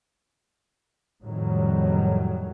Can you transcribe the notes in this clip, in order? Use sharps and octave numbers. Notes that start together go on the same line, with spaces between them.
F2 A2 D#3 F#3 G3